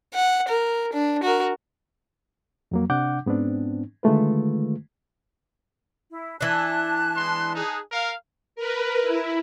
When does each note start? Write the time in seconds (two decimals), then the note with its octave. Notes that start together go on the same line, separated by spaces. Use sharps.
0.14 F#5
0.48 A#4
0.93 D4
1.23 F#4 A#4
2.71 F2 F#3 A#3
2.90 C3 D4 F#5 D6 G6
3.26 G#2 B3 C4 D4
4.03 D3 D#3 G#3 A3 F4 B4
6.11 E4
6.41 E3 D4 A5 F#6
7.15 G#3 B3 C6
7.55 D#4 G#4
7.92 A#4 F5
8.56 A#4 B4
9.03 E4